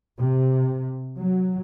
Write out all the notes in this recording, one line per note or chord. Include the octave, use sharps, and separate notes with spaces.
C3
F#3